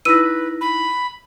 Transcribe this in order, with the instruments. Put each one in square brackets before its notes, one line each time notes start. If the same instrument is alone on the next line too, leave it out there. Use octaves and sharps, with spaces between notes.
[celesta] D#4 E4 A#6 [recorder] B4 [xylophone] E6 D#7
[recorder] B5